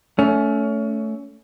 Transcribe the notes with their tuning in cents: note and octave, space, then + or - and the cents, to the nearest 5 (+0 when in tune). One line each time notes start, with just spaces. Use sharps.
A3 +0 C#4 +25